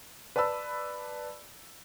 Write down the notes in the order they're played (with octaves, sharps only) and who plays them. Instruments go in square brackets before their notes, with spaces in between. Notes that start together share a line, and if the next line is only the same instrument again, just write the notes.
[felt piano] B4 D5 A5 B5 E6